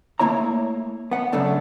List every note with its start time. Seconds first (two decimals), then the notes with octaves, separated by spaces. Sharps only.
0.19 A3 A#3 E4 C#5 A#5
1.11 B3 F#5
1.32 F#2 C#3 A3 D4